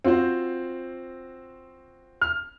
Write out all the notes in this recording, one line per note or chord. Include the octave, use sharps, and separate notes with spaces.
C4 F4 F#4 C5
F6